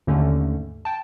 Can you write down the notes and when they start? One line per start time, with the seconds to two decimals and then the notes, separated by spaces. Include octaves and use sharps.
0.07 D#2 G#2 D3 A3 C#4
0.85 G5 A5